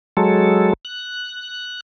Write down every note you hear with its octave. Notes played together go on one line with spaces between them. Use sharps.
F#3 G#3 A4
F#6